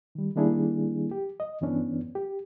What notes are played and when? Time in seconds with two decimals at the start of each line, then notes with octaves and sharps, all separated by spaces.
0.15 D#3 G3
0.36 D#3 G3 A#3 D4 E4 G#4
1.11 G4
1.40 D#5
1.61 G2 E3 B3 C#4 D4
2.15 G4